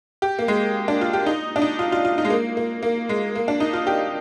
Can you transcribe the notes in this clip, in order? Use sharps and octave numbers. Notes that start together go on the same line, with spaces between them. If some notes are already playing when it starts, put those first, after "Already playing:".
G4
A#3
G#3
D4
F4
G4
D#4
D4
D#4
F4
F4
F4
D#4
G#3
A#3
A#3
A#3
G#3
A#3
D4
D#4
F4
G4